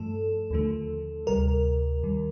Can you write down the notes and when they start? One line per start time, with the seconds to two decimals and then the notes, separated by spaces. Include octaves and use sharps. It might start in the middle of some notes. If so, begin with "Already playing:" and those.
Already playing: G2 F3 A3 A4
0.51 D#2 D3 F3 A3
1.27 D2 C3 G3 A#4
2.03 D#2 D#3 G3